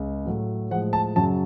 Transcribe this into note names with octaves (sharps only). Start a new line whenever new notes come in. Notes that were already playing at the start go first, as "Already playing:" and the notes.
Already playing: C#2 C#3
A2 F#3 A3
A2 F3 G#3 F#5
A5
F#2 C#3 F#3 A5